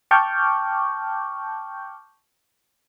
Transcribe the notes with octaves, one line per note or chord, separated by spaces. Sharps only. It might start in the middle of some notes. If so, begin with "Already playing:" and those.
G5 A5 C#6 D6 F6 G6